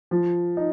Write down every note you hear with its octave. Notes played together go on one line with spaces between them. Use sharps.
F3
D#4